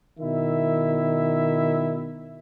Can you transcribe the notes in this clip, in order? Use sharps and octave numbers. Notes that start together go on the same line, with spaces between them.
B2 D#3 E4 E5